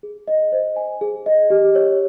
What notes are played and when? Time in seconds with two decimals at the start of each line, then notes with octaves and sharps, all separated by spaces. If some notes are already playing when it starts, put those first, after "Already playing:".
0.03 G#4
0.28 D#5
0.52 C5
0.76 G#5
1.01 G#4
1.26 D#5
1.50 G4
1.75 C#5